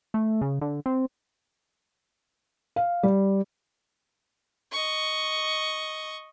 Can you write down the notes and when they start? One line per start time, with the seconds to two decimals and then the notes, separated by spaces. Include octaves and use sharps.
0.14 A3
0.41 C#3
0.61 D3
0.86 C4
2.76 F5
3.03 G3
4.72 D#5 C#6